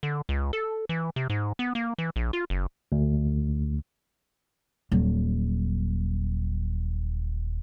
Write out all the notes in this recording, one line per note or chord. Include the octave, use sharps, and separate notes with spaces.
D3
C#2
A4
E3
C3
G#2
B3
A#3
E3
A#1
F4
F#1
D2
D#1 F#3